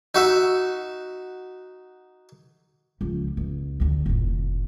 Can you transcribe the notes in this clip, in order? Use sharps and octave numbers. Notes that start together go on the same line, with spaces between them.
D#4 F#4 E5
C#2 F3
C#2
D2 D3
F1 A2